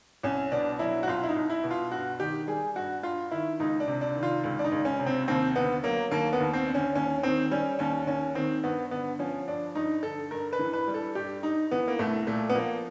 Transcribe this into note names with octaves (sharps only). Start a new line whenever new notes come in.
C2 C#4
B2 D4
F#3 E4
F#4
C2 F4
E4
D#4
C2
E4
B2
F4
G2 F#4
D#3 G4
G3 G#4
G2 F#4
G2 F4
D#3 E4
C#2 D#4
D4
C3
D4
D#3
F4
C#2
D4
D#4
C#2
C#4
C3
C4
D#2 C4
D3 B3
F#3 A#3
D#2 A#3
B3
D#2
C4
D3
C#4
D#2 C#4
D#3 C4
G3 C#4
D#2 C#4
D#2 C#4
D#3 C4
G2 B3
D3 B3
F3 C#4
G2 D4
G2 D#4
D3 A4
G2 A#4
B4
E3
B4
G3
A4
G2 G4
G2 D#4
E3 B3
A#3
C2 A3
A#2 A3
B3
F3 A#3